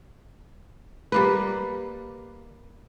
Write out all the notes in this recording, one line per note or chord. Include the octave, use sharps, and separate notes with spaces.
G3 A#3 B4